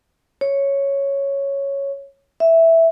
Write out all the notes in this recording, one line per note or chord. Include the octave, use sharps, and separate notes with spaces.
C#5
E5